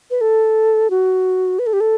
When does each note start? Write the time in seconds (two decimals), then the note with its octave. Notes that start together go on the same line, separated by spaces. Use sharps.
0.11 B4
0.21 A4
0.90 F#4
1.59 B4
1.67 A4
1.73 G4
1.80 A4